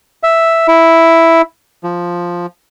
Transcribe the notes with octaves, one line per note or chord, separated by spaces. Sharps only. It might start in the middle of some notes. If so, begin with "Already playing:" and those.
E5
E4
F3